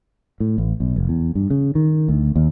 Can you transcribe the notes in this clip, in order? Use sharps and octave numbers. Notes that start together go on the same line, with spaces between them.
A2
A1
B1
F1
E2
G2
C#3
D#3
D2
D#2